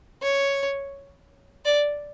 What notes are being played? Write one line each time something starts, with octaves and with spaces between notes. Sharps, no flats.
C#5
D5